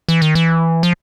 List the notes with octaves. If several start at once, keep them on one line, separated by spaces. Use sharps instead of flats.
E3
D#3
E3
F3